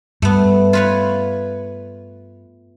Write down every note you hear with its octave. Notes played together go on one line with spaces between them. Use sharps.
G2 A3 B3
F4 B4 C#5